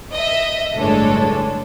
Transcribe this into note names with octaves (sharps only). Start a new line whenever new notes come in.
D#5 E5
G1 A2 G#3 D4 A4 C#5